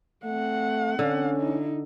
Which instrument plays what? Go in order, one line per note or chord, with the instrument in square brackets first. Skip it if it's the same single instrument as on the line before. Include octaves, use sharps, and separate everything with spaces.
[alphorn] A3 [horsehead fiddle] C4 F#5
[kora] D3 [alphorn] C#4
[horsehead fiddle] D#4 E4